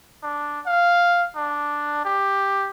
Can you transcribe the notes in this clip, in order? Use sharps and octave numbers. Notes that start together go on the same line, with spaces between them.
D4
F5
D4
G4